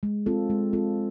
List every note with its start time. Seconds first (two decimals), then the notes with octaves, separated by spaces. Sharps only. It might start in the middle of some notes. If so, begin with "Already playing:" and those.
0.03 G#3
0.26 C4 F4 A4
0.50 G#3
0.73 C4 F4 A4